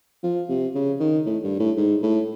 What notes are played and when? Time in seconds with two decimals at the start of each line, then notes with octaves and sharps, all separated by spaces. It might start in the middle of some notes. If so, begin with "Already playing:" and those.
0.24 F3
0.49 C3
0.75 C#3
1.00 D#3
1.26 A2
1.43 G2
1.60 A2
1.77 G#2
2.02 A2